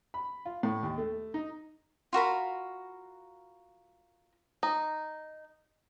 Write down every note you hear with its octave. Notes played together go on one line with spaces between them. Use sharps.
B5
F4
A2
D#2
A3
D#4
F4 F#4 A#4 B5
D#4